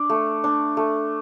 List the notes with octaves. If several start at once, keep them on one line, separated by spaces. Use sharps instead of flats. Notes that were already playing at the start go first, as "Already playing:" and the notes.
Already playing: D4 D6
A3
D4
A3